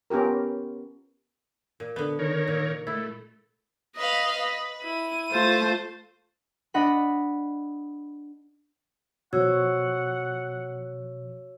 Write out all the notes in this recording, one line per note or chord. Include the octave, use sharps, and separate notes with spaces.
B3 C#4 F4 G4 A#4
A#2
D3 B3
D#3 A#4 C#5
A#2
A3 E4
B4 D#5 F5
B4
E4 D#7
A3 F4 C5 A5
D4 D#5 F#5 B5
B2 F3 F#4 C#5 F#5 E6 G#6